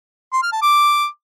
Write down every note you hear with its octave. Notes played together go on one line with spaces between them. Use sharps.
C6
F6
A5
D6